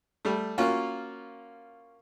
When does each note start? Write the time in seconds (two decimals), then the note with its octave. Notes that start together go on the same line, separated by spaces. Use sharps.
0.25 G3 A3
0.58 A#3 C#4 F4 F#4